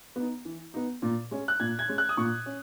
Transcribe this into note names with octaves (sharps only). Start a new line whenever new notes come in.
B3 D#4
E3
B3 D#4
A#2
G#3 C#4
F#6
A#2 G#6
G#6
G#3 C#4
F#6
D#6
A#2 C#6
C#4